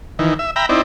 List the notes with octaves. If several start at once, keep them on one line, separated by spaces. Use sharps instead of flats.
D#3 E3
E5
E5 G5 A#5 B5
C4 D#4 E4 D5